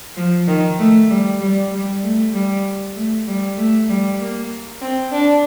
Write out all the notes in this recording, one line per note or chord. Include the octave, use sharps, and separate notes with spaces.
F3
D#3
A3
G3
G3
G3
A3
G3
A3
G3
A3
G3
A#3
C4
D4